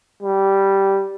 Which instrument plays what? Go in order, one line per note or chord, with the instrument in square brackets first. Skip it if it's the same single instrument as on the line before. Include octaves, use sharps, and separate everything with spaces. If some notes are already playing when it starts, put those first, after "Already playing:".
[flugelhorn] G3